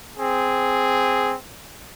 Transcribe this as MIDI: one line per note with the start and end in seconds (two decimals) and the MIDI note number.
0.17 1.34 60
0.17 1.34 68